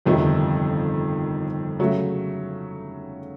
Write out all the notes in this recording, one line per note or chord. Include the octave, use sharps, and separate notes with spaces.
G1 F2 C3 D#3
C#3 F#3 A3